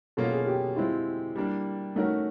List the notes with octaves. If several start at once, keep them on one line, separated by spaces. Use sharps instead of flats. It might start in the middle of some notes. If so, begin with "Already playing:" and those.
B2 F#3 A#3 C#4 F4 A4
G#4
G4
F#4
G#3 C4 E4 F4
G3 A#3 D4
A3 C#4 D#4 F#4 A#4